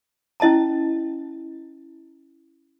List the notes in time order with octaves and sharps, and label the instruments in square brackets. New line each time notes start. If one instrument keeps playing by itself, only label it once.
[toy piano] C#4 E4 D#5 A5 A#5